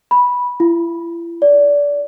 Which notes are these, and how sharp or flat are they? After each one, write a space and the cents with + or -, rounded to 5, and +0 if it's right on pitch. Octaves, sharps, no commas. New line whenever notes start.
B5 -10
E4 +40
D5 -25